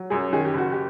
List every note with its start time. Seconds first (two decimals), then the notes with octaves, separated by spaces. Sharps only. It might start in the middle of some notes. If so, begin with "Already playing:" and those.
Already playing: F#3
0.10 F#2 G#4
0.33 D#3 G#4
0.45 G4
0.53 F#1 F#4
0.72 G4